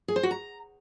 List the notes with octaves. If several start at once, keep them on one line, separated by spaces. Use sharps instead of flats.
G#4
C5
F#4
A#5